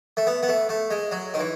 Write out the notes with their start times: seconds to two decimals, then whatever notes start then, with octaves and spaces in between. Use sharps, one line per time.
0.17 A3
0.27 B3
0.43 B3
0.48 A3
0.69 A3
0.91 G#3
1.11 F#3
1.34 D#3
1.39 E3